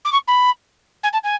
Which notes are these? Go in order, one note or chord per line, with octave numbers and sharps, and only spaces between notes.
D6
C#6
B5
G#5
A5
G#5